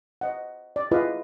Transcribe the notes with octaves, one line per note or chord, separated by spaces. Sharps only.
C5 D#5 F#5
D5
E4 F4 G#4 B4 D#5 F5